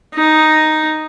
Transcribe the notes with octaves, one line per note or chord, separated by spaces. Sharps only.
D#4